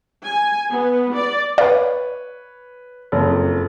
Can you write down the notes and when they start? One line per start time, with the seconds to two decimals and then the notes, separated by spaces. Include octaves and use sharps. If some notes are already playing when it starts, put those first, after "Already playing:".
0.24 G#5
0.71 B3
1.15 D5
1.58 B4 C#5 D5 F5
3.12 F#1 F2